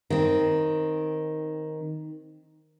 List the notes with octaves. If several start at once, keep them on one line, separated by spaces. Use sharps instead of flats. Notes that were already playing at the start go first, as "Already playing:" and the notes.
D#3 C4